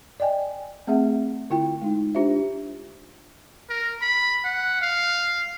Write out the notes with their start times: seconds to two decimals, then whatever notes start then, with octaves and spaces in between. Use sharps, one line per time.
0.20 D5 D#5 G5 G#5
0.87 A3 C4 G#4 E5 F#5
1.50 D3 E4 F4 G5
1.81 G#3 D#4
2.15 D4 F4 G4 C5 E5
3.69 A#4
4.02 B5
4.45 F#5
4.82 F5